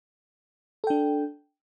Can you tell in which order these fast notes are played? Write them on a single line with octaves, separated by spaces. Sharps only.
A4 G5 D4